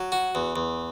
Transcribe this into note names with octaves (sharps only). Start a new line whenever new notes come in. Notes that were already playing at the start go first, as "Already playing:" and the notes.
Already playing: F#3
F#4
E2
E2